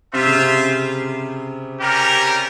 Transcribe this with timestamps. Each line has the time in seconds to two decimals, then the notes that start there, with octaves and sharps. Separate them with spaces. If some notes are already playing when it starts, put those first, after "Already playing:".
0.13 C3 F4 C5 E5
0.25 C#3
0.37 C3
1.80 G3 C#4 G4 A#4